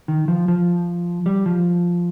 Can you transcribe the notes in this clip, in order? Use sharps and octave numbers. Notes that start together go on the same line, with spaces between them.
D#3
F3
F3
G3
F3